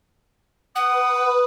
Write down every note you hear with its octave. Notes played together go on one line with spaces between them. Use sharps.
B4 F#5 D#6